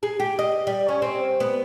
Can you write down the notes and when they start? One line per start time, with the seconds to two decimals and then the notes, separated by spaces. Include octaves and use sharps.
0.03 G#4
0.20 G4
0.39 D#5
0.67 G3
0.88 C#4
1.02 C4
1.40 B3